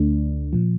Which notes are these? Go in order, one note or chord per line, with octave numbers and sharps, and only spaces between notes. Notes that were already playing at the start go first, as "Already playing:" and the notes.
Already playing: D2 D3 A3 D4
A#2 F3